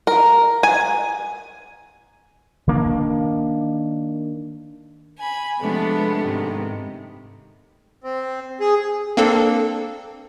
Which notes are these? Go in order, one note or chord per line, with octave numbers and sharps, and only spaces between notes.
A#4
G#5
D#3 A#3 D4
G#5 B5
C3 F3 G#3 A3 B3 D4
G#2 C3 D#3
C4
G#4
A#3 C4 D4 A4